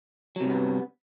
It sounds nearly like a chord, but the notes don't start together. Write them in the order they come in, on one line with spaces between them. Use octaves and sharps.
F#3 C3 G2 B3